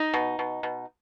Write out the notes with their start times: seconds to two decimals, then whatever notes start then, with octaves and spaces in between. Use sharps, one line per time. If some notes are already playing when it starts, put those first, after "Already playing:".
Already playing: D#4
0.14 B2
0.39 B2
0.63 B2